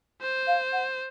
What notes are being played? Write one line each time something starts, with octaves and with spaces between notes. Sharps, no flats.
C5
F5
F#5